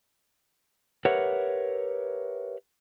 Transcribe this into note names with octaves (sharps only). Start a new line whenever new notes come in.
G4 A#4 B4 C#5 E5 F#5